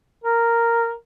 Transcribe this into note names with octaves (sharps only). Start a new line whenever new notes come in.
A#4